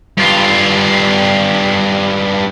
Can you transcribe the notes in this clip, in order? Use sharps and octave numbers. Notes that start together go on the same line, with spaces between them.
G2 F4